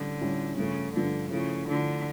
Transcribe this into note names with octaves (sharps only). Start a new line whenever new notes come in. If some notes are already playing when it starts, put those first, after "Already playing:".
Already playing: A2 D3 G3 C#4
A2 G3 C#4
G2 C#3 F3 A3
G2 D3 F3 A3
C#3 F3 A3 E4
D3 F3 A3 E4